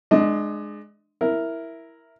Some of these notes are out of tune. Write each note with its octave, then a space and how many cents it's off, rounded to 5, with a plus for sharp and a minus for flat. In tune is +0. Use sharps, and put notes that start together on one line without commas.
G#3 +10 D4 +35 D#5 +20
E4 +0 A#4 +0